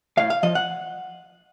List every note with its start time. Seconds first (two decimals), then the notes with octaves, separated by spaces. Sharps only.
0.17 A2 F5
0.30 F5
0.43 F3 D#5
0.55 F#5